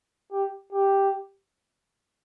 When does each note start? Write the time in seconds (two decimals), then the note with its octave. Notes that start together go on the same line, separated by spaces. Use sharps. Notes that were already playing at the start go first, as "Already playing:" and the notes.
0.32 G4
0.73 G4